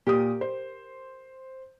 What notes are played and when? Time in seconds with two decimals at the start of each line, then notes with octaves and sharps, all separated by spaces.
0.07 A#2 G4 A#4 D#6
0.41 C5